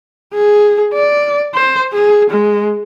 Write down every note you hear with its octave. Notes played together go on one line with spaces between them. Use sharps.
G#4
D5
C5
G#4
G#3